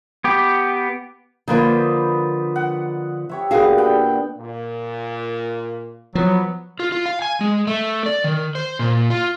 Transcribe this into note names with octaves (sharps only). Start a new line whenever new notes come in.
B3 G4
D3 F3 A#3 D#4 B4 D6
F#5
G4 C#5 E5
A#2 D3 B3 F#4 G#4 F5
D4 F#5 G5
A#2
F3 F#3 B3
F4
F4
F5
G#5
G#3
A3
D5
D#3
C5
A#2
F4